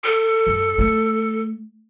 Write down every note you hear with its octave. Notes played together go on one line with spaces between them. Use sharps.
A4
F#2
A3